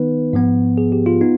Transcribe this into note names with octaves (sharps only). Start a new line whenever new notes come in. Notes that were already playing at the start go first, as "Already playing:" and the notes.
Already playing: D#3 B3 D#4 B4
G#2 F3 B3
G#4
G4
F4
B3 D#4